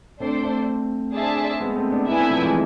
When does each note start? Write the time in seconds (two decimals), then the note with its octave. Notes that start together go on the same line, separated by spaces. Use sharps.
0.20 A3 C4 D4 A4 C5
0.43 A3 C4
1.14 D4 G#4 C5 E5 A5
1.60 G#3 B3
1.76 A3 C4
1.91 B3 D4
2.07 B3 D4 E4 B4 E5 G#5
2.19 A3 C4
2.30 F3 A3
2.42 E3 G#3